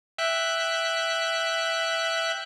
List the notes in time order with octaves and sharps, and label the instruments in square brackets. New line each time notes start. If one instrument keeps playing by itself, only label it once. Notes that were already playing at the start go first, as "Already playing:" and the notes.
[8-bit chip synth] E5 G5 F#6